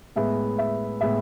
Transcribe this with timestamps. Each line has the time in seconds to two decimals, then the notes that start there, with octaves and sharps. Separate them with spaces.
0.16 A2 G#3 B3 E5
0.58 E5
1.01 A2 G#3 B3 E5